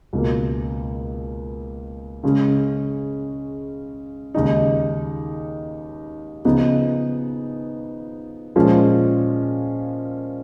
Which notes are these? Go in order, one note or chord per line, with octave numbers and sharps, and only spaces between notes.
C#2 B2 A#3
C#3 G#3 C#4 G#4
D#2 C#3 G#3 D#4
C#3 F3 B3 D#4
A#2 F3 G#3 C#4